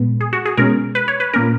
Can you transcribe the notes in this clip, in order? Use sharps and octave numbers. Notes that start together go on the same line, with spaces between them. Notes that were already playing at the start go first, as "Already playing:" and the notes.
Already playing: A#2 G#3 B3
G#4
F#4
G#4
B2 G#3 C#4 A#4
B4
C#5
B4
A#2 A#3 C#4 A#4